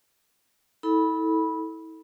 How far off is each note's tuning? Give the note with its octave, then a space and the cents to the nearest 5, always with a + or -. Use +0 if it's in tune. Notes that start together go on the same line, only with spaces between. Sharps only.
E4 -40 A4 +0 B5 -15